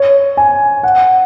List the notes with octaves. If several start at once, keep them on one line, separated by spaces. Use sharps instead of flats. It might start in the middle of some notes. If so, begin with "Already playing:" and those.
Already playing: C#5
G#5
F#5